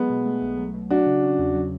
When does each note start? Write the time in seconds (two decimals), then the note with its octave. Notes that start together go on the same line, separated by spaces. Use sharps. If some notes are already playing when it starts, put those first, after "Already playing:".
Already playing: F#3 G#3 B3
0.10 B2
0.26 A3
0.42 B1
0.58 F#3
0.74 B2
0.90 F#3 D4 F#4
1.06 C#3
1.23 C#4
1.39 E2
1.55 F#3